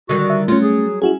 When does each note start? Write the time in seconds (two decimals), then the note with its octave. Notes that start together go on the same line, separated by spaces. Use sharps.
0.09 D3 D#3 G3 F#4
0.30 E5
0.48 F#3 A3 C#4 F4
0.63 G#4
1.02 C#4 E4 F#4 G#4